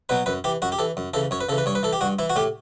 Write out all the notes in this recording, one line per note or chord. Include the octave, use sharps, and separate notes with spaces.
B2 F#3 B4
F#2 B4
E3 G4
F#2 F#4
G4
E3 A4
F#2
C#3 E3 A4
F#2 C#5
B4
C#3 E3 A4
B4
G2 C#5
B4
E3 A4
G4
G2 F#4
E3 E4
F#4
A2 G4